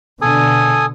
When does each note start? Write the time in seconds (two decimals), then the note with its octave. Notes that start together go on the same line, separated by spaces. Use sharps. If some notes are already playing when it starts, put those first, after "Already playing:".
0.22 B2 D3 A4 G#5 D#6